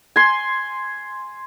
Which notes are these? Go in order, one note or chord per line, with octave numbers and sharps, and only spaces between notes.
G#5 C6